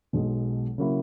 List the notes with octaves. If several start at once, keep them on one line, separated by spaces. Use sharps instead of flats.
B1 B2 G#3
C#3 F#3 A#3 E4